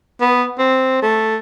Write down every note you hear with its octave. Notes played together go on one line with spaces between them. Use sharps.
B3
C4
A3